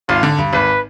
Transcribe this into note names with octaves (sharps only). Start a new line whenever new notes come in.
G#1 F4
D3
G2
G#1 B4